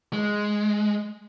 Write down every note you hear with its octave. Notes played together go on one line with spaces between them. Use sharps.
G#3